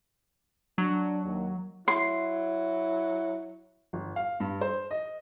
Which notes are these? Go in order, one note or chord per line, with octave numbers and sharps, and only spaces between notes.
F#3 D4
D#2
F#3 E4 C6
G1
F5
G2
C5
D#5